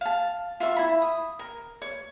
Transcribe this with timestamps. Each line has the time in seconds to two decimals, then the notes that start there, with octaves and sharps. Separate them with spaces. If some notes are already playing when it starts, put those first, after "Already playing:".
0.01 F5 A5
0.60 F4 E5 F5 C#6
0.76 E4 B5
1.02 D#6
1.39 A#4
1.82 C#5